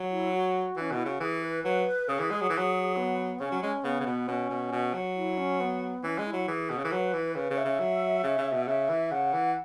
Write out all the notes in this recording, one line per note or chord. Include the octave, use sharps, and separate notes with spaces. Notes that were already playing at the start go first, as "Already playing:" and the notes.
Already playing: F#3
E4
F#4
E3 C#4
B2 E4
C#3 F#4
E3 G#4
B4
F#3 B4
C#3 G#4
E3
G#3
F#3
E3
F#3
B3
C#3 C#4
F#3
G#3 C#4
C#3 B3
C#3
B2
B2 C#4
B2
B2
F#3
E4
C#4
B3
E3 C#4
G#3
E4
F#3
E3 G#4
B2
C#3
E3
F#3 B4
E3
C#3 B4
C#3
E5
C#3
F#3
C#3
C#3
B2
C#3 E5
E3
C#3 F#5
E3